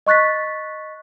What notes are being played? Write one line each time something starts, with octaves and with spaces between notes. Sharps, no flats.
D#5 C#6 F#6 A6 B6